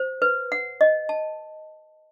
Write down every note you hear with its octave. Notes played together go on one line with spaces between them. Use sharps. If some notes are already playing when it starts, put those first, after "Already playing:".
Already playing: C5
B4
F#5
D#5
A5